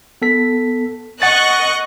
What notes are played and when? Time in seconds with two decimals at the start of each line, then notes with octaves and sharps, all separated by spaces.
0.22 B3 A4 B6
1.22 D#5 F#5 C#6 F#6 A6